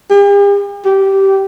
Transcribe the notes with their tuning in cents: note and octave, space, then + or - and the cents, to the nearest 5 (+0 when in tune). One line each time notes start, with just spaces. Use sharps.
G4 +45
G4 -15